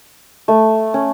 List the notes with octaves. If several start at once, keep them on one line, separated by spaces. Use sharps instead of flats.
A3
C#4